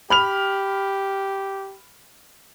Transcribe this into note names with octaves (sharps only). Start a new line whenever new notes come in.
G4 B5 F6 F7